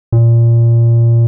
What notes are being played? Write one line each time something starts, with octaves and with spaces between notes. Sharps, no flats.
A#2